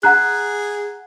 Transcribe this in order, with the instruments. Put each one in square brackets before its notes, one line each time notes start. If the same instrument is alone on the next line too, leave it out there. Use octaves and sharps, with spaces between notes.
[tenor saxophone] G#4 [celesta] F#5 A#5 F#6